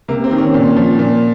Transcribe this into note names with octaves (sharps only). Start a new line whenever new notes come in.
C3 A#3
C4
D#3
C#4
A#2
F3
A#2